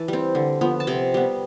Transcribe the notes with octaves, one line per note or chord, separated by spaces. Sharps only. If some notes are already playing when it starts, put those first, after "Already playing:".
Already playing: E3 A5
G3 C4
D3
F3 B3
A5
C3 G5
G3 B3